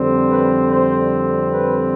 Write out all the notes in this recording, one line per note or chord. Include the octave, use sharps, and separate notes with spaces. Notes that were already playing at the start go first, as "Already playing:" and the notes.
Already playing: F2 D3 G3 C4
B4
C5
B4